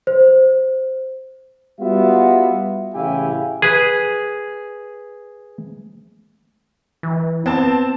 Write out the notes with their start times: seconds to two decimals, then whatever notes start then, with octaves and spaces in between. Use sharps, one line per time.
0.07 C5
1.80 G3 B3 F4 F#4 E5
2.94 A1 C#3 E4 G4 F5 G#5
3.62 G#4 B4
7.03 E3
7.46 B3 C4 A5